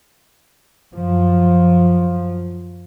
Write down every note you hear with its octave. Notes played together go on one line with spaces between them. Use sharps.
F#2 F3